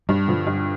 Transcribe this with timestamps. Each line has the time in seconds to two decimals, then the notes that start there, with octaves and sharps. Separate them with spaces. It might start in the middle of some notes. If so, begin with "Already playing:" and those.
0.09 G2 G3
0.28 D3 F3
0.47 G2